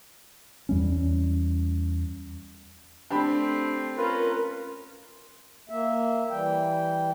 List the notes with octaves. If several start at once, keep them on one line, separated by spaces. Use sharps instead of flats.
E2 G3 C#4
A3 C4 D4 G4 B5
C#4 F4 A#4 B4
A#3 E5
E3 G3 G5